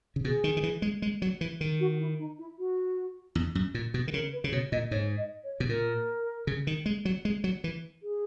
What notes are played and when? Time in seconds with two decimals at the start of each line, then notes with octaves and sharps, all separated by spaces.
0.16 C#3
0.24 B2 G#4
0.44 D#3
0.57 D#3
0.63 E3
0.82 G#3
1.02 G#3
1.22 F#3
1.41 E3
1.61 D#3
1.80 F#4
1.99 E4
2.18 D#4
2.38 E4
2.58 F#4
3.35 E2
3.55 F#2
3.74 A#2
3.94 B2
4.08 D#3
4.14 C#3 A#4
4.32 B4
4.44 C#3
4.52 B2 C#5
4.72 A#2 D#5
4.91 G#2 C#5
5.17 D#5
5.43 C#5
5.60 B2
5.69 A#2 A#4
6.47 C#3
6.67 D#3
6.86 G#3
7.05 F#3
7.25 G#3
7.44 F#3
7.64 E3
8.02 G#4